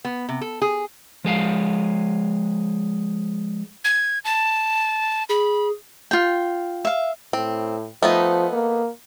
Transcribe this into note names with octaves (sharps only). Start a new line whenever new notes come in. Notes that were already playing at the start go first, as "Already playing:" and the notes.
B3
C3
A4
G#4
F3 G#3 F5
G#6
A5
G#4 B5
F4 G5
E5 F5
A2 C4
F3 A3 B3 D#4
A#3